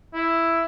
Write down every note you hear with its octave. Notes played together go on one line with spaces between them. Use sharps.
E4